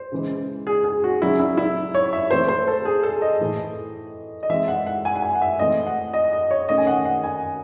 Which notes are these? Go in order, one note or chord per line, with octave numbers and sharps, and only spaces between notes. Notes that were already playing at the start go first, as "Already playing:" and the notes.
Already playing: C5
C#3 E3 G#3
G#4
G#4
F#4
C#3 F#3 C#4 E4
E4
E4
C#5
E5
E3 A3 C4 C5
C5
A4
G#4
A4
D#5
A2 E3 A3
D#5
E3 G#3 C4 E5
F#5
F#5
G#5
F#5
G#5
F#5
E5
E3 A3 C4 D#5
F#5
D#5
D#5
C#5
D#3 A3 C#4 D#5
G#5
F#5
F#5
G#5